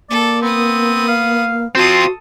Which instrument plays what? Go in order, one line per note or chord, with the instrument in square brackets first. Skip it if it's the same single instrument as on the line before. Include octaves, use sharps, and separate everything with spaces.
[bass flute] A#3 [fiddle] A4 [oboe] D5
[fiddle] B3 D#6 [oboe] C4
[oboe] F5
[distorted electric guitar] C4 F4 [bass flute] F#4 [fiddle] A4 D#6 [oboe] C6